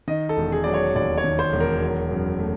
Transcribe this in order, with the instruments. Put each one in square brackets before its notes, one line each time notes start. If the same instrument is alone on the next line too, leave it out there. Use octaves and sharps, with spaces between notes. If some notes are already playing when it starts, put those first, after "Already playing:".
[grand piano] D#3 D#5
A4
E1
G#4
F#3 D5
C#5
D#2 D5
C#5
D#3
C5
E1
A#4
F#3
F#2
A3